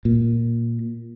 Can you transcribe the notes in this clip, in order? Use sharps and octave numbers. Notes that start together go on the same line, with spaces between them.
A#2